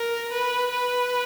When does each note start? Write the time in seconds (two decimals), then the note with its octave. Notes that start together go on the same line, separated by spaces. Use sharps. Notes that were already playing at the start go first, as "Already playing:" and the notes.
Already playing: A#4
0.32 B4
0.71 B4